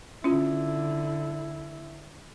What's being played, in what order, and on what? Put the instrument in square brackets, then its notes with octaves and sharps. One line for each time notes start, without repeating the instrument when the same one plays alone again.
[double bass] D3 E4 [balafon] C#4 F4